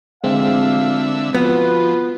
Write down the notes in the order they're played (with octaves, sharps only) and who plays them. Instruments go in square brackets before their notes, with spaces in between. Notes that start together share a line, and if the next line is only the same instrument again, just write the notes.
[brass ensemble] A1 F3 F5 [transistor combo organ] D3 E5 [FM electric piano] G#3 C4
[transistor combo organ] F3 [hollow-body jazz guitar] B3 [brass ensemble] F4 F#4 B4